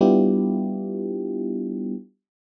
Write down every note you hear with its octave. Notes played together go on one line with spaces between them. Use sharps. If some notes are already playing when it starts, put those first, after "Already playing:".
G3 B3 D4 E4 F4 G4